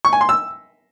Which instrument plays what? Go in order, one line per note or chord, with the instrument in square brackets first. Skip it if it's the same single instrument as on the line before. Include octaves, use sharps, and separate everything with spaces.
[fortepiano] C#6
G#5
C6
E6